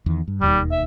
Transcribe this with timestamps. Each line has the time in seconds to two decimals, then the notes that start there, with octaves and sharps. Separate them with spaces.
0.06 E2 D#3
0.28 G2
0.41 E1 D#2 D#3 G3
0.72 E5